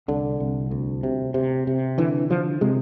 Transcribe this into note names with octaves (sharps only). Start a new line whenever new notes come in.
C2 D3
C2
D2
C3
C3
C3
D3 E3
D3 F3
C3 G#3